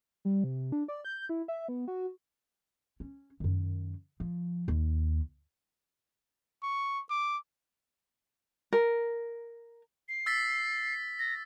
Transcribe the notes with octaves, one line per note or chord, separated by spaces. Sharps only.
G3
C3
D4
D5
G6
E4
E5
B3
F#4
C#4
F#2 D#3
F3
D#2
C#6
D6
A#4
C7
E6 A6 B6
A#6